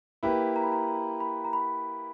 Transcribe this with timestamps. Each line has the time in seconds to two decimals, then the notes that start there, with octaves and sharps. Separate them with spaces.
0.23 A#3 E4 G4 B4 B5
0.56 A#5
0.63 B5
0.72 A#5
0.88 A#5
1.20 B5
1.44 A#5
1.53 B5